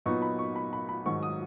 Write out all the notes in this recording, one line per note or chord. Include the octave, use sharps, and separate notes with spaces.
A#2 F#3 B3 D#4 C#6
B5
C#6
B5
B5
B5
G#2 D#3 F#3 C#6
D#6